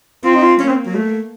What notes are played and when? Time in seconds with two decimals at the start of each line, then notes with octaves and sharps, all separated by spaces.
0.24 C4 F4
0.34 D#4
0.42 F4
0.60 A#3 C#4
0.68 C4
0.86 F#3
0.95 A3